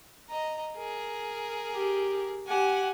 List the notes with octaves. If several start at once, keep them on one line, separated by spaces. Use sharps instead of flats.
D#5 A#5
G#4 A#4
G4
G4 F#5 G#5